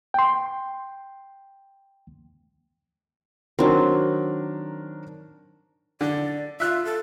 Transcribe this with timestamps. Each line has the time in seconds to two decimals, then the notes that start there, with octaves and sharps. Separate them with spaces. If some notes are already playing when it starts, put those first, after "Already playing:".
0.14 G5 C6
3.59 D#3 F#3 C4 D4 A#4
6.01 D3 D5
6.60 F4 E5 F#6
6.85 A4